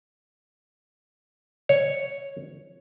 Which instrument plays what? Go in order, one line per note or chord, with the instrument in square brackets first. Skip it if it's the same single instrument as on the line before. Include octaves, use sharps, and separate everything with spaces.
[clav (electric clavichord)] C#5